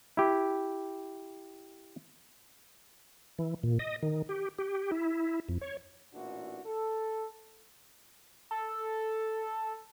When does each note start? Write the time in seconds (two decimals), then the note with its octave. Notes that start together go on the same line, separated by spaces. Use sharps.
0.17 E4 G4
3.39 E3
3.63 A#2
3.79 D#5
4.03 D#3
4.29 G4
4.59 G4
4.92 E4
5.49 F2
5.61 C#5
6.13 A1 A#2 D4 E4 F#4
6.65 A4
8.51 A4